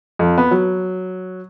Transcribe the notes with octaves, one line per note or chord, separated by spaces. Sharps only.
F2
B3
F#3